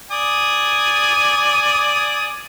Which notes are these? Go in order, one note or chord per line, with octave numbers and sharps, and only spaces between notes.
D5 G#5 D#6